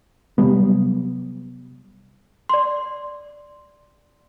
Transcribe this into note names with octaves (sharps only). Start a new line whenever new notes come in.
C3 F#3 G3 B3
D5 C6